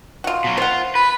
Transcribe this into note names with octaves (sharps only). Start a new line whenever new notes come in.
F4 F#4
B2 F#3
F4 C5 F#5
B4 B5